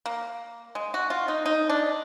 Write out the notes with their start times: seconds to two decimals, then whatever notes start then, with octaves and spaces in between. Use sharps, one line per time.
0.06 A#3
0.75 G#3
0.94 F#4
1.10 F4
1.28 D#4
1.46 D#4
1.70 D4